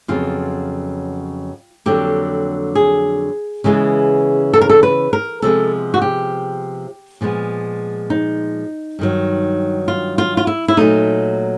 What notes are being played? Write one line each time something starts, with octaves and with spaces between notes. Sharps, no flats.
F2 C#3 F#3 B3 F4
F2 D3 F#3 A#3 G4
G#4
C#3 E3 G#3 B3
A4
A#4
A4
B4
A#4
C3 F3 G#3 B3 A4
F#4
G4
A#2 F3 G#3 B3
D#4
G2 D#3 F#3
F4
F4
F4
E4
E4
A#2 F#3 A3 D#4